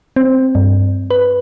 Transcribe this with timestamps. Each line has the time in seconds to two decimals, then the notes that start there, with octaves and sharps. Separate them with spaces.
0.16 C4
0.55 G2
1.11 B4